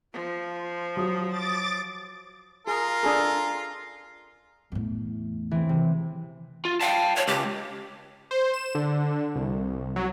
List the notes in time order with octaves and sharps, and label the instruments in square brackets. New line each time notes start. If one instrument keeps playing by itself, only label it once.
[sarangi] F3 [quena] F4
[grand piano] F#3 F#4 [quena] D#6
[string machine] D6 A6
[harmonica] F4 A#4 [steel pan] G#4
[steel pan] D4 G#4 A4
[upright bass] E2 A2
[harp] E3 C4
[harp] C3 [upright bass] D#3 D4
[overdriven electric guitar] F4
[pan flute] F5 [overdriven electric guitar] G5 A5
[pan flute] C#5
[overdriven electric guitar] C#2 [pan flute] G4
[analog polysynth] C5
E7
D3
C2
F#3